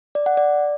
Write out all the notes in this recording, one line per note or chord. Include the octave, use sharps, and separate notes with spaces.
D5
F#5
D5